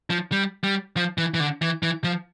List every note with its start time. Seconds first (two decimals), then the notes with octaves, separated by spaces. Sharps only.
0.10 F3
0.32 G3
0.64 G3
0.97 F3
1.18 E3
1.34 E3
1.40 D3
1.62 E3
1.83 E3
2.04 F3